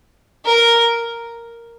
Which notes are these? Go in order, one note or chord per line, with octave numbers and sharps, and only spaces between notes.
A#4